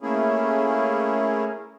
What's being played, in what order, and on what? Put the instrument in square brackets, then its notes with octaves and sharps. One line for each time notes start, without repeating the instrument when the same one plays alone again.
[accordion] A3 A#3 C#4 E4 G#4